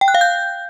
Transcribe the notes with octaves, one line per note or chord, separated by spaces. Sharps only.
G5
F#6
F5
G6